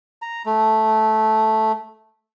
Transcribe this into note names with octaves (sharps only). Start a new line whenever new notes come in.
A#5
A3